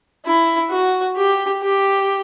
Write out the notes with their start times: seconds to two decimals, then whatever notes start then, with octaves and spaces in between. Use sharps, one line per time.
0.26 E4
0.71 F#4
1.16 G4
1.62 G4